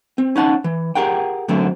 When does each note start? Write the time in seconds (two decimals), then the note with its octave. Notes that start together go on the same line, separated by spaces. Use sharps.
0.18 C4
0.36 C#4 D#4 F#5 A5
0.64 E3
0.95 G4 G#4 A#4 F#5 G5
1.48 F#2 D3 F#3 A3 C4